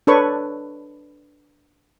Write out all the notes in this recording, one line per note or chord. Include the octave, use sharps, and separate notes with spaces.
D4 A4 B4 C#5 C#6